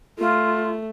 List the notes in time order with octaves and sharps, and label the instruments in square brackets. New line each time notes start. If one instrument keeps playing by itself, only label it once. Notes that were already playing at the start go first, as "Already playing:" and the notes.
[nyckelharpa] A3 [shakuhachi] F4